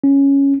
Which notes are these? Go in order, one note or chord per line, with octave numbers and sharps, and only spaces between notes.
C#4